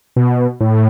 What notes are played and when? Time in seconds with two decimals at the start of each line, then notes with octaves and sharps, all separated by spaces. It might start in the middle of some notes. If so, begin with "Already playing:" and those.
0.16 B2
0.60 A2